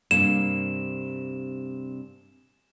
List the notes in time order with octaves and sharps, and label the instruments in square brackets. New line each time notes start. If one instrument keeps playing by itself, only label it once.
[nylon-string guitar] G2 C3 A#3 [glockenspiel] E7